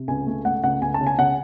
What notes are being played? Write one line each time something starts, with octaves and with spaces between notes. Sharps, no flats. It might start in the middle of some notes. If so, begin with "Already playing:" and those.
Already playing: C3
C#2 G#5
A3
A3 F#5
C#2 F#5
C#2 G#5
A5
C#3
G#5
C#3 F#5